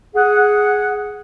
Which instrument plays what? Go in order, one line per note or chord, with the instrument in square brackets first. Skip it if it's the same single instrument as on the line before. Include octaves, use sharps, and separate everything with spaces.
[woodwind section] G#4 F#5